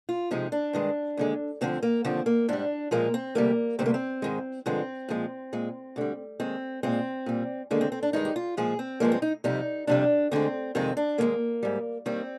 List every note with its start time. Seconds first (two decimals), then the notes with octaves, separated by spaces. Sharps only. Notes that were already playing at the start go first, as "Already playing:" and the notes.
0.09 F4
0.31 F2 C3 F3 G#3 D#4
0.52 D4
0.73 G2 D#3 G#3
1.17 D#2 D3 G#3
1.61 D2 D3 F3 C4
1.83 A#3
2.04 D#2 D3 F3 C4
2.26 A#3
2.49 G#2 G3 D4
2.91 A#2 F3 G#3 A#3
3.14 C4
3.35 D2 C3 G3 A#3
3.79 D2 C3 G3 C4
3.86 A#3
3.94 C4
4.22 G#2 D#3 G#3
4.66 G2 D3 F3 G#3 C4
5.09 A#2 F3 G#3
5.53 A#2 G#3
5.96 D2 D3 G3
6.40 D#2 D#3 G#3 C4
6.83 A#2 G#3 C4
7.26 A#2 G3
7.71 D#2 D3 G#3 A#3
7.81 C4
7.92 C4
8.03 D4
8.13 G2 D#3 G#3 D#4
8.25 G4
8.36 F4
8.57 A#2 F3 G#3 G#4
8.79 C4
9.00 G2 F3 G#3 A#3
9.12 C4
9.22 D#4
9.44 F2 C3 G3 D#4
9.87 F2 C3 G3 D4
10.31 D2 D3 G#3 C4
10.75 F2 C3 D#3 G#3 C4
10.97 D4
11.18 D#2 D#3 G#3 A#3
11.63 G#2 G3
12.06 D#2 D#3 G3 C4